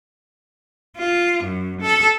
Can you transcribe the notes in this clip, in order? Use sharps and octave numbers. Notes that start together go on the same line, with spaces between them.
F4
F#2
A4